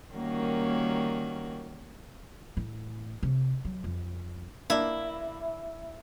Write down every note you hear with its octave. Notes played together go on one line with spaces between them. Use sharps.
D#3 G3 A#3 C#4 F#4 A#4
A2 E3
C3
F#3
F2
A#3 D4 E4